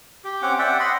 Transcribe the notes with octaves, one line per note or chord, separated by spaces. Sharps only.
G4
C4 C#4 F#5 D6
D5 E5 F#5 G5
D#5 F#5 B5 C6